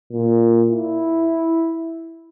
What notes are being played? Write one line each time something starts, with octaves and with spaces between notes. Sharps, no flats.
A#2
E4